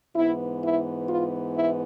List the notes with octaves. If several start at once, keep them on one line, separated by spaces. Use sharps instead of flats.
G#2 E3 B3 E4
E4
F4
E4